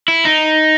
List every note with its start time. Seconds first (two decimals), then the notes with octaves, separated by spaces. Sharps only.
0.08 E4
0.25 D#4